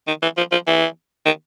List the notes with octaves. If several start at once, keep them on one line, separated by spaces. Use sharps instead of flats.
D#3
E3
F3
F3
E3
D#3